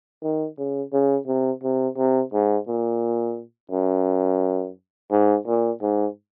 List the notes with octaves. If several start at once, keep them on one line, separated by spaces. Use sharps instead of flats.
D#3
C#3
C#3
C3
C3
C3
G#2
A#2
F#2
G#2
A#2
G#2